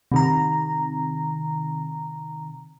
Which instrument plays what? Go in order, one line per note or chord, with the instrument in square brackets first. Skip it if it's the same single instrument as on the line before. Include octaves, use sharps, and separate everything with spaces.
[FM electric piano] C3 D#3 A#5